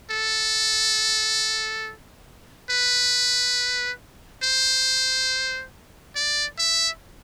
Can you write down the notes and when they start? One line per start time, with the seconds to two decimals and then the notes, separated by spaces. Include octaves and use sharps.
0.11 A4
2.70 B4
4.43 C5
6.16 D5
6.59 E5